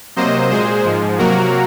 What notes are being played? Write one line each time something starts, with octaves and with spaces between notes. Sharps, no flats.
C3 F#3 A#3 C5 D#5
A#2 G#3 G#4 C5
G#2 F3 G#3
C3 F#3 A#3 F#4 A#4